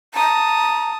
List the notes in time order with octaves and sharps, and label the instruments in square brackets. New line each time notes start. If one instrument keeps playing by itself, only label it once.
[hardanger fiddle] A5 D#6 [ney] A#5